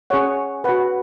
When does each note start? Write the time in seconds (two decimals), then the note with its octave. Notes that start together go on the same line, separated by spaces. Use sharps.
0.10 C#4 G#4 C#5 F#5
0.64 B4 F#5
0.69 F#4